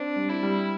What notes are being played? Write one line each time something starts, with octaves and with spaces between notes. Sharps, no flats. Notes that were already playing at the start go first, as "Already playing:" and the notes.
Already playing: C4 D4
G3
E4
G3